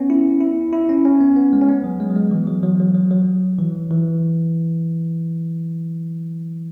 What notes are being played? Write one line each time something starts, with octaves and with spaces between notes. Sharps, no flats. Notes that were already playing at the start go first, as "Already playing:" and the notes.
Already playing: B3 C#4
E4
E4
E4
C#4
C#4
B3
B3
G#3
C#4
B3
F#3
G#3
F#3
G#3
E3
F#3
F#3
F#3
F#3
F#3
E3
E3